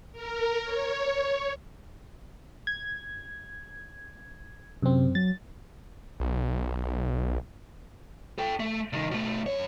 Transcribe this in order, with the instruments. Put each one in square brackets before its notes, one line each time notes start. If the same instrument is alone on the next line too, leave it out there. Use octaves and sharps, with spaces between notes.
[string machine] A#4
C#5
[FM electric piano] G#6
[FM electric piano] F#2 C4 [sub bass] C3
[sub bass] F#3 [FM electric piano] A6
[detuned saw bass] B1
[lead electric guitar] A4 G5
A3
C2 D#3
B2 A3
F#2 C#5